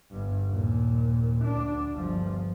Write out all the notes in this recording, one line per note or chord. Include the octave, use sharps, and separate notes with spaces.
G1 G2
D#2 A#2
D2 D4
G1 F3